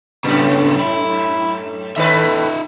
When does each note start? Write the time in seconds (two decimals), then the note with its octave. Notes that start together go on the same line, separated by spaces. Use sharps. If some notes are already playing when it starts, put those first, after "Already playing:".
0.24 F#2 A2 C#3 B3
0.80 E4
1.96 D#2 A2 D#4 B4 E5